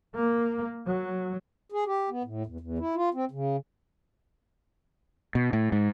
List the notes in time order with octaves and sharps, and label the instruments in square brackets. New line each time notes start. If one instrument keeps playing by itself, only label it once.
[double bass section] A#3
F#3
[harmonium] G#4
G4
B3
A2
E2
E2
E4
F4
C4
C#3
[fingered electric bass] B2
A2
G#2